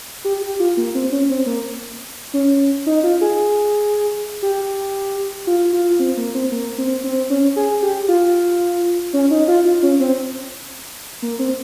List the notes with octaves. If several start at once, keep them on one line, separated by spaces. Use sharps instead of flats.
G4
G4
F4
A#3
C4
C#4
C4
A#3
C#4
D#4
F4
G#4
G4
F4
F4
C4
A#3
C4
A#3
C4
C4
C#4
G#4
G4
F4
C#4
D#4
F4
F4
C#4
C4
A#3
C4